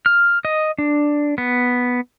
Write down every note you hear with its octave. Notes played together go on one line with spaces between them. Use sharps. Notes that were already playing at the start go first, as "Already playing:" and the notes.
F6
D#5
D4
B3